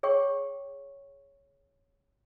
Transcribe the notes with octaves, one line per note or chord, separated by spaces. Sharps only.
G#4 C#5 G5 C#6